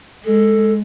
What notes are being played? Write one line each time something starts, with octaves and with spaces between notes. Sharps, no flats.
G#3 A4